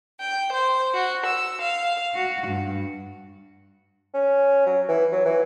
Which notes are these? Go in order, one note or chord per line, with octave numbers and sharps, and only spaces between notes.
G5
C5
F#4
E6
F5
F#4
G2
C#4
F#3
E3
F#3
E3